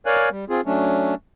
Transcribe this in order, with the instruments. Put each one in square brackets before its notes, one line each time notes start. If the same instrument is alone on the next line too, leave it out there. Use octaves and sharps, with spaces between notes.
[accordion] A#4 C#5 D5 F5 G#5 F#6
G3
C4 F4 G#4
F#3 A3 C#4 D4